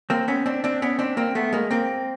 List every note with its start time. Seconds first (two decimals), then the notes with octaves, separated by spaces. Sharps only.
0.10 A#3 C4
0.28 B3 C#4
0.46 C4 D4
0.64 C4 D4
0.82 B3 C#4
0.99 C4 D4
1.17 A#3 C4
1.35 A3 B3
1.53 G#3 A#3
1.71 A#3 C4